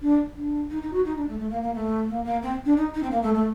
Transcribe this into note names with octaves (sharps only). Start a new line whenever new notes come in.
D4
D4
D#4
D#4
F#4
D#4
D4
A3
A3
A#3
A#3
A3
A#3
A#3
C4
D4
D#4
D#4
C4
A#3
A3
A3